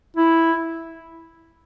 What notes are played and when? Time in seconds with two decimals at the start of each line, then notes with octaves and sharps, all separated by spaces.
0.16 E4